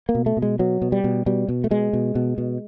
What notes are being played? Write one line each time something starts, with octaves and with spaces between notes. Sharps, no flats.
A#3
B2
A3
B2
G#3
B2 F#3
B2
G3
B2
B2 G3
B2
A3
B2 G#3
B2
B2
B2